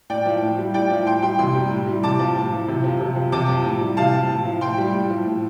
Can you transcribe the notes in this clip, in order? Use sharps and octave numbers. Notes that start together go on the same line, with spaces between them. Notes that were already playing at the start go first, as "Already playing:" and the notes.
A2 D5 G5
F3
A2
G3
A2 D5 G5
F3
A2 G5 C6
G3 G5 C6
C3 G5 C6
G3
A2
G3
C3 A5 D6
F3
A2
F3
C3
F3
C3
F3
C3 A5 D6
F3
A2
G3
C3 F5 A5
F3
A2
F3
A2 G5 C6
G3
A2
F3
A2